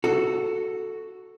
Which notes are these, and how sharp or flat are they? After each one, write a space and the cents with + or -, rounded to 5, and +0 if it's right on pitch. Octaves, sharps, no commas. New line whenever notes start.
F#4 +0 A4 +0